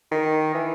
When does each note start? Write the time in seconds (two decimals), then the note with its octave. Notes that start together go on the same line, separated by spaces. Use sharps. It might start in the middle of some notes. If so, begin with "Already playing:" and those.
0.12 D#3
0.55 E3